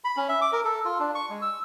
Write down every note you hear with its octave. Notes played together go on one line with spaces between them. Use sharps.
B5
C#4
E5
D6
A#4
A4
F4
D4
C#6
G#3
E6